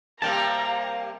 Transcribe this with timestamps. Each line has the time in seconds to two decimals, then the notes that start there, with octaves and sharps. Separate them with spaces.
0.22 C3 G3 A#3 A#4 F5 G5 A5 A#5